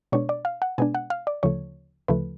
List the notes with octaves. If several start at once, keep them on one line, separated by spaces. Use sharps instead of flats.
B2 G#3 B3 D4 C#5
D5
F5
F#5
B2 G#3 B3 D4 G#5
F#5
F5
D5
D2 C#3 F3 A3 C#5
D2 C#3 F3 A3 B4